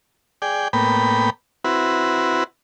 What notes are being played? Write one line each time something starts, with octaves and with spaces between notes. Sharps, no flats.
G#4 D5 G5
A2 A#3 B3 G5 B5
C4 E4 F#4 B4